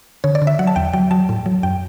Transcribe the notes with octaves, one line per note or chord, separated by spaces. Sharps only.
D3 C#5
D5
D3
E5
F#3 F#5
A5
E2 G5
F#3 G5
F#3 A5
A2
F#3
F#2 G5